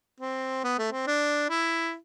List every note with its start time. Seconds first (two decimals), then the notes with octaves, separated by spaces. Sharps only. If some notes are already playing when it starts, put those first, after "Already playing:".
0.20 C4
0.64 B3
0.78 A3
0.92 C4
1.07 D4
1.50 E4